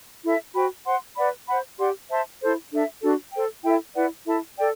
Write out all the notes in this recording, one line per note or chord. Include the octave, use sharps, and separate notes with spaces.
E4 A4 E5
F#4 C5 G5 B5
C5 F#5 C6
B4 D5 F#5 B5
C5 F#5 B5
G4 D5 F#5 C6
C5 E5 A5 C6
E4 A4 C5
D4 A4 E5
D4 F#4 A4
A4 C5 G5
E4 A4 E5 G5
E4 B4 D5 F#5
E4 A4 E5 A5
A4 D5 G5